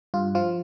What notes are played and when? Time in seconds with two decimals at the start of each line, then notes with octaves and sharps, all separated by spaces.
0.14 G2 F4
0.35 F3 F4